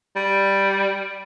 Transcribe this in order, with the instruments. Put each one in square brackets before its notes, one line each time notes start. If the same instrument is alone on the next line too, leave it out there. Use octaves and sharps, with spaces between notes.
[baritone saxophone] G3